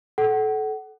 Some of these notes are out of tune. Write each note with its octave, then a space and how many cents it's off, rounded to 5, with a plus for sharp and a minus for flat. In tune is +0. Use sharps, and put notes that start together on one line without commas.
A4 -25 F#5 +25